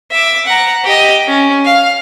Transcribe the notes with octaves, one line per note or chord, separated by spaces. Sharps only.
E5 D6
F#5 A#5
G4 D#5
C#4
F5